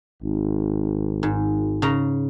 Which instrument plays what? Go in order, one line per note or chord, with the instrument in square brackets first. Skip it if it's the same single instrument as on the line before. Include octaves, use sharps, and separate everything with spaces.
[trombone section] G#1
[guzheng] G#2
C#3 A#5